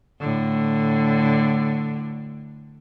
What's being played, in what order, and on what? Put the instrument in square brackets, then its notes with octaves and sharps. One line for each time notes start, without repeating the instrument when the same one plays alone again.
[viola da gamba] A2 D3